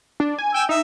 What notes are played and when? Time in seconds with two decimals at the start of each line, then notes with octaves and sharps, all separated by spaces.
0.20 D4
0.39 G#5
0.54 G5 G#5 E6
0.69 D#4 E5